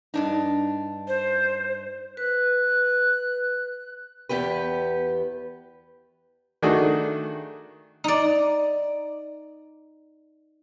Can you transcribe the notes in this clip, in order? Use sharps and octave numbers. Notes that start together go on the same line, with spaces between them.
G2 D4 D#4
C5
B4 F#6
E2 B3 G4 B4
D#3 A3 D4 F#4 G#4
D#4 D5